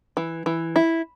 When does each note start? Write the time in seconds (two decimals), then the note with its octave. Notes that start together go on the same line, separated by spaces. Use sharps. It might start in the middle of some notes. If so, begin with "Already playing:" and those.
0.17 E3
0.46 E3
0.76 E4